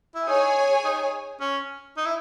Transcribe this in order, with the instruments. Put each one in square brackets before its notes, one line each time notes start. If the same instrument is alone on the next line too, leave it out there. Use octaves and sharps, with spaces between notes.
[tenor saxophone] E4
[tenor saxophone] D#4 [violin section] G#4 C#5 G#5
[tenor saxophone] D#4
C#4
D#4
E4